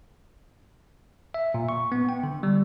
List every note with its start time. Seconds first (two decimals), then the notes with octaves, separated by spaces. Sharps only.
1.34 E5
1.54 A#2
1.69 C#6
1.92 B3
2.09 G5
2.23 D3
2.43 G3